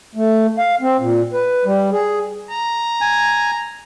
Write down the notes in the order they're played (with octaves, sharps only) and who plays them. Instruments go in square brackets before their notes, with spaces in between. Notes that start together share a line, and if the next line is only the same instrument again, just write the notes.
[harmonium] A3
F5
C4
A#2
B4
G3
G#4
[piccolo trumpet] A#5
[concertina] G#5